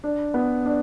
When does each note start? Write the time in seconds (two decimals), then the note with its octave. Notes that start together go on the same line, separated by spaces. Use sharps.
0.04 D4
0.34 B3
0.66 D4